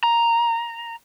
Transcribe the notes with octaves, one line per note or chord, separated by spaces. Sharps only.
A#5